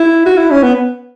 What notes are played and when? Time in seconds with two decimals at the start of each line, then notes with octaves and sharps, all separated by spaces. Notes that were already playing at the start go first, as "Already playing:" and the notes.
Already playing: E4
0.26 F#4
0.37 E4
0.50 C#4
0.63 B3